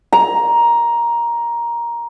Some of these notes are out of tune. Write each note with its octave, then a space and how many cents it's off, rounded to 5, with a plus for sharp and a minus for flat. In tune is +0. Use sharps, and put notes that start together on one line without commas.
A#5 +10